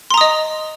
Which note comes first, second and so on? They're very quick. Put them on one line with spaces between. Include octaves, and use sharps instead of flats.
C6 A#5 D#6 D#5